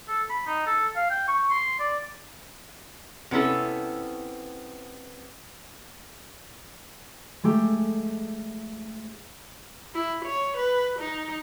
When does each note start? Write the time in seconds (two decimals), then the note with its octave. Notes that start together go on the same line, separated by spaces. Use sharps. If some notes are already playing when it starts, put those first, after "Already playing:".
0.08 A4
0.30 B5
0.47 D#4
0.66 A4
0.96 F5
1.10 G5
1.28 C#6
1.50 C6
1.79 D5
3.31 C3 B3 C#4 E4 A4
7.44 G#3 A3 G4
9.95 E4
10.24 C#5
10.57 B4
10.99 D#4